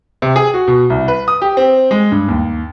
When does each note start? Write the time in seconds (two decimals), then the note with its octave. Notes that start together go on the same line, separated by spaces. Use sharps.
0.22 C3
0.36 G#4
0.54 F#4
0.68 B2
0.90 C2
1.08 B4
1.28 D#6
1.42 G4
1.57 C4
1.91 G#3
2.12 G2
2.28 D#2